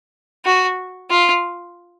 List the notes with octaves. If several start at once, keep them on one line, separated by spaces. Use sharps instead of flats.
F#4
F4